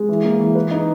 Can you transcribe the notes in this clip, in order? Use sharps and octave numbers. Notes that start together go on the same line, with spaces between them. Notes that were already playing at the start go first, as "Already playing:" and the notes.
Already playing: G#3
E3
A#3
E3
B4
D#4